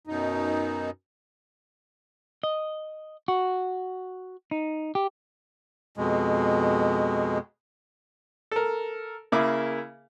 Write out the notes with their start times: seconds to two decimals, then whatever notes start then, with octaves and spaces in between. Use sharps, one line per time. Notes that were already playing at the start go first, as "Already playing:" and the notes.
0.07 F#2 B2 D#4
2.43 D#5
3.28 F#4
4.51 D#4
4.95 G4
5.97 F2 B2 G#3
8.52 A4 A#4
9.32 C#3 A#3 E4 G#4 D6